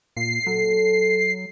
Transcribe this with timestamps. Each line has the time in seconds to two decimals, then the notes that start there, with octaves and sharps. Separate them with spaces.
0.17 A#2 C7
0.46 F#3 A4